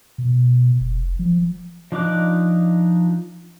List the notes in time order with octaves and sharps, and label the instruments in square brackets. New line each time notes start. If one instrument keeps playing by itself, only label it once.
[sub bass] B2
F1
F3
[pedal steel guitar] F3 D4 D#4 D6 F#6